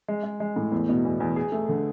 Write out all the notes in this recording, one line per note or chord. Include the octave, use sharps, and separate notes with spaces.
G#3
G#3
G#3
A2
E2
B2
E2
E2
G#4
A3
D3